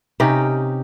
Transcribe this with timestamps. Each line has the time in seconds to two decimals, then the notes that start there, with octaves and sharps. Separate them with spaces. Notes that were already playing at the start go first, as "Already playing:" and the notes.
0.20 C3 C#4 D#4 G4